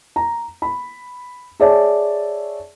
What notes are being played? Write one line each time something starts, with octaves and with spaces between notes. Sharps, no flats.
A#5
B5
G#4 C#5 D5 E5 A5